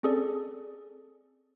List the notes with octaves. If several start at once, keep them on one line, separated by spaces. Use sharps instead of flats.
C4 C#4 G#4 A4 D5